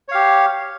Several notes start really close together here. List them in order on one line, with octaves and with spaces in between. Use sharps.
C#5 F5 G4